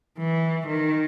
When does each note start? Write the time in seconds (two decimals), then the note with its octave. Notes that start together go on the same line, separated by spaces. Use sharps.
0.19 E3
0.68 D#3